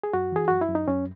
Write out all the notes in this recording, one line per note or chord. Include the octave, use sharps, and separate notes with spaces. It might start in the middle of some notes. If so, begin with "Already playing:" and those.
G#4
F#2 F#4
E3 G#4
F#2 F#4
E4
F#2
D#4
F#2 C#4